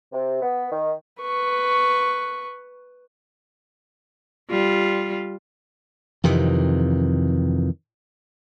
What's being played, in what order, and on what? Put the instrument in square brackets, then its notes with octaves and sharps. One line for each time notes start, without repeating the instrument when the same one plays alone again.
[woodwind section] C3
B3
D#3
[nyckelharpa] B4 C#6
[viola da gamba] G3 F4
[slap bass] F2 C3 D#3 E3